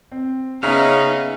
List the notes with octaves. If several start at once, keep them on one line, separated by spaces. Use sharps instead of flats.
C4
C#3 B3 C#4 D#4 G#4 E5 F5 A#5